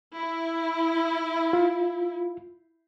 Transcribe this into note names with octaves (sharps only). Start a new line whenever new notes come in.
E4
F4